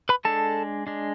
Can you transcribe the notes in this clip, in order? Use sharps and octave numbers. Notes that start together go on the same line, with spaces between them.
B4 B5
G#3 D4 A4 A5
G#3 D4